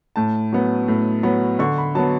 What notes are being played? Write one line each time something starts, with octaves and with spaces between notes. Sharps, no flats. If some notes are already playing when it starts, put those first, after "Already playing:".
A2 A5
F#3 B3
A2
F#3 B3
D3 C#6
B5
F#3 B3 A5